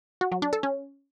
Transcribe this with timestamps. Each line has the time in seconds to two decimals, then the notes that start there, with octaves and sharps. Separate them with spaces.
0.21 F#4
0.32 F#3
0.42 D4
0.53 A4
0.63 C#4